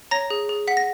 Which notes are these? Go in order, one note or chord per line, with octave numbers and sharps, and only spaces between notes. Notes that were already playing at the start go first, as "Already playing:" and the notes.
C#5 A#5 A#6
G#4
G#4
F#5 B6
A#6